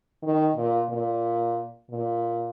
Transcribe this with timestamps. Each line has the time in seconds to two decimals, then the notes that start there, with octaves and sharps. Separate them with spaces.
0.23 D#3
0.56 A#2
0.90 A#2
1.90 A#2